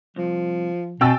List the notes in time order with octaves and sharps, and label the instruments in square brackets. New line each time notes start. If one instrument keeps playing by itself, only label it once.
[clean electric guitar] C2 [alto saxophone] F3
[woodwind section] B2 [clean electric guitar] C4 G#5 [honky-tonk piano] G5 E6 A6